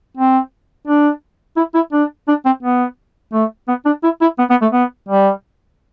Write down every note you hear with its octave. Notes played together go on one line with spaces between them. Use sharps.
C4
D4
E4
E4
D4
D4
C4
B3
A3
B3
D4
E4
E4
B3
B3
A3
B3
G3